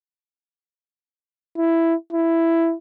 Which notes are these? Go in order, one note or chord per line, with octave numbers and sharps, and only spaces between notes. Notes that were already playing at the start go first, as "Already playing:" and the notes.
E4
E4